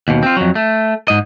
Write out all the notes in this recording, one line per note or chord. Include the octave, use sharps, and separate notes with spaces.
D#2 B2
C4 F4
F2 F#3
A3
G#2 D#5